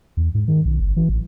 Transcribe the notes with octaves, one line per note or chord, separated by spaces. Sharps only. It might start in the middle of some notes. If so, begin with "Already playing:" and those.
E2
G#2
D#3
B1
G1
E3
A1